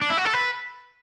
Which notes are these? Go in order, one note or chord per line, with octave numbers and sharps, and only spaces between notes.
D4
E4
F#4
A4
B4